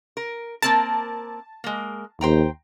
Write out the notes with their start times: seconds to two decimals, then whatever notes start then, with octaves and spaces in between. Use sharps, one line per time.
0.17 A#4
0.62 A#3 C4 A#4 A5
1.64 G#3 A#3
2.21 D#2 C5 G5 A#5